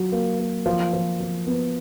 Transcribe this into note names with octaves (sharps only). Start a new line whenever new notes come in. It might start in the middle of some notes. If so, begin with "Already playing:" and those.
Already playing: F#3 F4
A#3
A#3
F3
F3
F3
B3